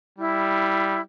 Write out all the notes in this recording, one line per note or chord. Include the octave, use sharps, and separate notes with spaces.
G3 E4